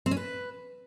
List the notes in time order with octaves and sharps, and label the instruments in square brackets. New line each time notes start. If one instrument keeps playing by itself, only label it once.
[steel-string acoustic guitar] C4
C#4
B4